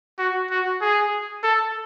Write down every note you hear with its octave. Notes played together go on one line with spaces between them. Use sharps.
F#4
F#4
G#4
A4